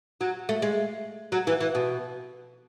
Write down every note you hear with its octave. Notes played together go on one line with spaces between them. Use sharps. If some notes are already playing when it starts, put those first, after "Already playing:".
F#3
A3
G#3
F#3
E3
E3
B2